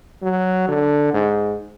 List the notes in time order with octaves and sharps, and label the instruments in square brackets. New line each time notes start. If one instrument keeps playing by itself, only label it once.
[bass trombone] F#3
D3
G#2